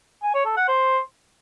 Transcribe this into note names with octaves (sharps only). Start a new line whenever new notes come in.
G#5
C#5
A4
F#5
C5